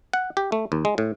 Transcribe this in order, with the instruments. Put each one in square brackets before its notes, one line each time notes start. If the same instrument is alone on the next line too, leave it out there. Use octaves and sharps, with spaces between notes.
[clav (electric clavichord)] F#5
G4
A3
D#2
G#3
A2